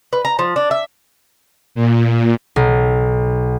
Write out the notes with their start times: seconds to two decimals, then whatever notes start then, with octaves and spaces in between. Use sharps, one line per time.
0.13 B4
0.25 A#5
0.39 F3
0.56 D4
0.71 E5
1.75 A#2
2.56 B1